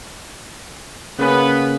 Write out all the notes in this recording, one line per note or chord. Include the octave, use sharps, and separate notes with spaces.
C#3 A#3 B3 C#4 B4